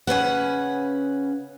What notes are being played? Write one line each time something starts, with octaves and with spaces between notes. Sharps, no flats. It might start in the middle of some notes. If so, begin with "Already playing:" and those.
C#3 C#4 B4 F#5